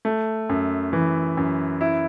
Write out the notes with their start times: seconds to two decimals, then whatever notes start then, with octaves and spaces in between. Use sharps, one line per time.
0.05 A3
0.49 F#2
0.93 E3
1.37 F#2
1.81 E4